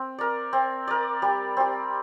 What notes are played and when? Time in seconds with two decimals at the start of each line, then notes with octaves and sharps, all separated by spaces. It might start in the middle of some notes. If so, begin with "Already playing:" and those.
Already playing: C4
0.18 A#4 D5
0.53 C4
0.88 A#4 D5
1.22 G3
1.57 C4 G4